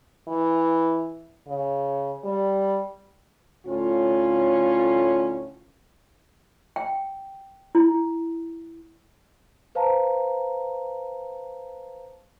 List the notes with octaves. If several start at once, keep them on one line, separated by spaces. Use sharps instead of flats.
E3
C#3
G3
D2 A2 C#4 F4
G5
E4
B4 C5 F5 A5 A#5